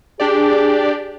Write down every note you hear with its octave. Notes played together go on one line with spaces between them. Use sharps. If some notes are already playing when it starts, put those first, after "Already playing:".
D4 G4 G#4 D5